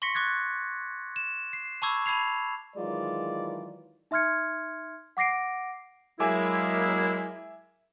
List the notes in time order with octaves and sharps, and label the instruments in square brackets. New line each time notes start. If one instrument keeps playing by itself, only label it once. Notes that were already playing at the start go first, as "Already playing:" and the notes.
[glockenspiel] C6 C#6 A#6 B6 C#7
C#6 D6 F#6 G#6 A6
E7
C7
A5 B5 C#6 D6 E6 G#6
A5 B5 G#6 C7 F7
[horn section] D#3 E3 F#3 G#3 F4 D5
[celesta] D#4 E5 C6 F6 G#6 C#7
F#5 D6 A#6 C7 D7
[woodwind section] F#3 E4 [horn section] G#3 A#3 [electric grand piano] E5 G#5 D6